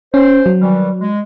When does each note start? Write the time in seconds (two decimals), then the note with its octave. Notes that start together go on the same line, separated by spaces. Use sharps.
0.14 C#4 C5
0.46 F#3
0.61 D#3 E3 G3
1.01 G#3